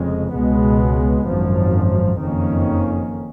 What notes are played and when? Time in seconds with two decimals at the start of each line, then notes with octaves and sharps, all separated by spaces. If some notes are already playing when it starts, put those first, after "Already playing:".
Already playing: F1 F2 C#3 G#3
0.34 C#2 B2 G#3 B3
1.27 G#1 F#2 F3
2.20 F#1 F2 D#3 A#3 C#4